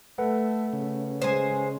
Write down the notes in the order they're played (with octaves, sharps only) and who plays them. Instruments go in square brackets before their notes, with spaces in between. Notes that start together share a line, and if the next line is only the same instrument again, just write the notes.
[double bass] A3 [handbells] A4 B4 F#5
[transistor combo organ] C#3
[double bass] G#3 [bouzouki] C5 G#5